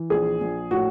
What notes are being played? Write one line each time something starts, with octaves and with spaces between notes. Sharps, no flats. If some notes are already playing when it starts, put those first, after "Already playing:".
Already playing: E3
A#1 G#4
A#1
A2 F#4